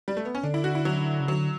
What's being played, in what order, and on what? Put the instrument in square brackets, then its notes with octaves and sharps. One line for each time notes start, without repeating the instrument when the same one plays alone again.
[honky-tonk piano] G3
A3
B3
C#4
[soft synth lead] D3 [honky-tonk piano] D4
[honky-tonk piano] E4
F#4
E4
F#3
[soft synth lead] C#3
[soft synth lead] D3 [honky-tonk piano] F#3